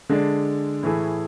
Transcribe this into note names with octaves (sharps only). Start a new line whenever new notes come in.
D3 G#3 D4 G#4 D5
A2 E3 A3 E4 G#4